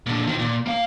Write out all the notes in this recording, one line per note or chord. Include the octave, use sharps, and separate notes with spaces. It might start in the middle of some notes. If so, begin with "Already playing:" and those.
A#2 D3
D#3 F3
A#2
A#3 F5